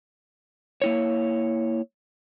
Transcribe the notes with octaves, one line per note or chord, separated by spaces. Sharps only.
A#3 E4 C#5